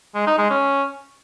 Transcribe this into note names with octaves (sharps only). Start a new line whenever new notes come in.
G#3
D#4
G#3
C#4